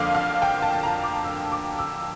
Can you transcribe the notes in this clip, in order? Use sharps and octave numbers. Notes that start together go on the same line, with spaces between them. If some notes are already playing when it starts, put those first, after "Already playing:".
Already playing: F2 D3 F3 A#3 D4 F5
F5
G5
A5
A#5
D6
E6
D6
E6